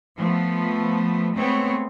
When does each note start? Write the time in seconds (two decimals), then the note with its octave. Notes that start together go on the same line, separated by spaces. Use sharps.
0.17 F3 A3 B3
1.35 G#3 A3 B3 C4 C#5